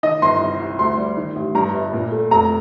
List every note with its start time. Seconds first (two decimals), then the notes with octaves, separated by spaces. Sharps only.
0.03 D#3 D#5
0.22 G1 C6
0.41 C2
0.60 C2
0.79 D2 C6
0.98 G3
1.17 D#3
1.36 A1
1.55 G2 A#5
1.74 G1
1.93 A#2
2.12 A3
2.31 F1 A#5